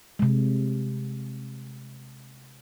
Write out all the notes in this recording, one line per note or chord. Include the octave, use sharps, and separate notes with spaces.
C3 G#3